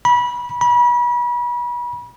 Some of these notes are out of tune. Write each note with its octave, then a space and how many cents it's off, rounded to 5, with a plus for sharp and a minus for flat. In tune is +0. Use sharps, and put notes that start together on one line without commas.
B5 -25
B5 -35